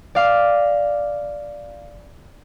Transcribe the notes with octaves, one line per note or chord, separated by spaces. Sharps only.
D5 F5 D6